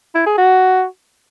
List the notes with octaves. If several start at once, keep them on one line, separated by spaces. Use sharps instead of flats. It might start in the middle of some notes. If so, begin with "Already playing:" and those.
E4
G#4
F#4